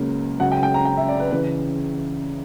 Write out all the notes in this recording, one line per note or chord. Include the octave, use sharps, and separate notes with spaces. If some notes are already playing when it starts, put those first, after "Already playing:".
Already playing: C#2 C#3 F#3 A#3
C#2 C#3 F#3 F#5
G5
G5
A#5
G5
E5
D5
B4
C#3 E3 B4